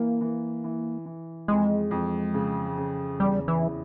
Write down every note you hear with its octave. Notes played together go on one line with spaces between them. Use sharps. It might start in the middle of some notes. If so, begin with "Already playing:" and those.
Already playing: E3 A#3
E3
E3
E3
F2 G#3
F2
C#3
C#3
E2 G3
E3
E4